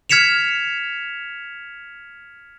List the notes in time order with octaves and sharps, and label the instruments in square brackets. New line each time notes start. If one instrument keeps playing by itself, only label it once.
[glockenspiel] F6 G#6 B6 C#7 E7 F7